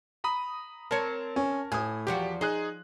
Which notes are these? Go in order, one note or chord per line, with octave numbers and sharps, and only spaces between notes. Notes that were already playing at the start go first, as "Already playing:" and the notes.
A#5 B5 D#6
C4 A#4 C#5 A5
C#4
A2 G#5 D#6
E2 F3 F#4 G4
D#4 G#4 C5 F#6